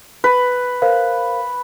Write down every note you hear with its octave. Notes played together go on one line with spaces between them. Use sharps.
B4
A#4 C5 F5